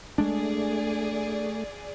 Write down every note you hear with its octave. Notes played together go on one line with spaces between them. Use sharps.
G#3 A3 D4 G#4 D5